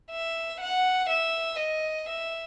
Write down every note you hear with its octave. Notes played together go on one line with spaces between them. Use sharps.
E5
F#5
E5
D#5
E5